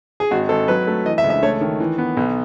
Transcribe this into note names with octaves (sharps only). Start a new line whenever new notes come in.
G#4
G#1 F#4
G#1 A4
F#3 B4
A3
E3 D#5
E5
C#2
E5
A3 C#5
D#3
E3
B3
B1